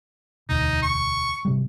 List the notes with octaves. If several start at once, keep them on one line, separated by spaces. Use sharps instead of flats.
E1 D2 D#4
C#6
G#1 C3 G3